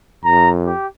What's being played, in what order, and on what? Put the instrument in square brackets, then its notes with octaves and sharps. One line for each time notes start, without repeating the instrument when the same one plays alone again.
[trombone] F2 [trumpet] A#5
[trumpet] G4